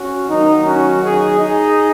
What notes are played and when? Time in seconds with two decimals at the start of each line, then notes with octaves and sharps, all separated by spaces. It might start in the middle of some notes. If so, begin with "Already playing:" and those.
Already playing: C#4 F#4
0.29 D#3 F#3 A#3 D#4
0.66 C#4 F#4
1.02 D#4 G#4
1.39 D#4 G#4